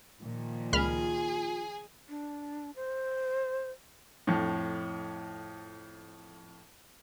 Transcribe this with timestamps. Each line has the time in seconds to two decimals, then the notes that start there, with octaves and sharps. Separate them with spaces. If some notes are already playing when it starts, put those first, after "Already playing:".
0.21 A#2 D#3 F3
0.73 C#2 F4 G#4 B5 F6
2.09 D4
2.76 C5
4.27 F2 A2